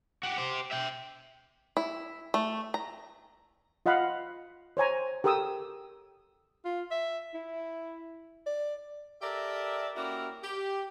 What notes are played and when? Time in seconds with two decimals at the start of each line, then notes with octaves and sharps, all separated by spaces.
0.23 F#4 G4
0.38 G4 C5
0.72 E5 G5
1.77 E4
2.34 A3
2.74 A#5
3.86 F4 D#5 F5 F#5 B5
4.77 C5 C#5 G#5 A#5
5.24 G4 A4 A#4 G5 D#6 E6
6.65 F4
6.91 E5
7.34 E4
8.46 D5
9.22 G4 A4 A#4 D5 E5
9.96 A#3 C#4 E4 F#4 G4 A#4
10.42 G4